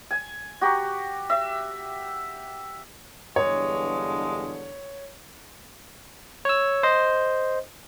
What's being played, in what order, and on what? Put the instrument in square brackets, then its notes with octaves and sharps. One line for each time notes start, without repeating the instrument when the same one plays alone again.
[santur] G#5
F#4 G4 A#5
E5
[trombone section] E2 G2 D3 [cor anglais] G#3 [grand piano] C#5
[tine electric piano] C#5 E6
C5 D#5